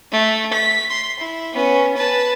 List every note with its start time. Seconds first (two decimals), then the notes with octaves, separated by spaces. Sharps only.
0.12 A3
0.53 B6
0.90 C6
1.19 E4
1.53 B3 C#4
1.97 B4 A5